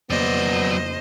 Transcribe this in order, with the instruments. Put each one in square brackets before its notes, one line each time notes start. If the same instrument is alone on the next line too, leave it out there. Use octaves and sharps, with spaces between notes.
[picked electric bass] F2 C#3 A#3 [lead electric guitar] F#3 D5 [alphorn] B3 [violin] C5 D#5